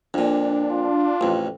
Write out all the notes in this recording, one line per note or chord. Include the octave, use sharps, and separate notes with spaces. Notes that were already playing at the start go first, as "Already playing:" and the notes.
F2 A#2 D4
F4
A1 F2